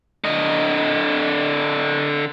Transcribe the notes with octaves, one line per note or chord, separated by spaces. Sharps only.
D3 D#5